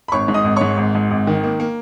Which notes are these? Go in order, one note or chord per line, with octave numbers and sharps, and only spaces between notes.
B5
G#1 C#5 C#6
G#2
D#5 D#6
G#1
G#2 C#5 C#6
G#1
G#2
G#1
D#3
A#3
A#3